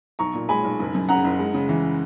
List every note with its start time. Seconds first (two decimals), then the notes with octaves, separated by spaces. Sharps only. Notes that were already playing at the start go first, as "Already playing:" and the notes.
0.19 B1 A#5 C#6
0.34 A#2
0.49 G#3 G#5 B5
0.64 B1
0.79 F#1
0.95 F#2
1.09 C#3 F#5 A#5
1.24 F#1
1.39 G#3
1.54 C#3
1.69 E3